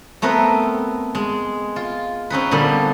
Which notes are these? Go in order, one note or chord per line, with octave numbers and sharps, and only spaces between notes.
A3 B3 C4 A#4 B4
G#3
F4
C4 C#4 D#4 B4
A#2 D3 G3 B3 G4